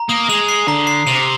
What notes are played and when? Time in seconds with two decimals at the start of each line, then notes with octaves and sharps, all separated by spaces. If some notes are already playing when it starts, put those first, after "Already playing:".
Already playing: A#5
0.09 A#3 D#6
0.29 G#3 F7
0.49 C7
0.67 D3 A#5
0.87 C7
1.07 C3 F7